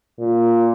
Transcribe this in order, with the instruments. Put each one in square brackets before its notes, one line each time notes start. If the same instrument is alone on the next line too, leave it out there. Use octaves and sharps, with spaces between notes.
[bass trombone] A#2